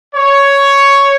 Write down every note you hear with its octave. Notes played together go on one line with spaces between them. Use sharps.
C#5